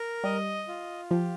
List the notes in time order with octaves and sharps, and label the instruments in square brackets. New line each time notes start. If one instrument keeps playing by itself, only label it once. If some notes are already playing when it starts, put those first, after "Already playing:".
Already playing: [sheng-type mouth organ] A#4
[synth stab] G3 [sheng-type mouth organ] D#5
[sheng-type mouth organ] F4
[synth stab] F3 [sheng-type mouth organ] G4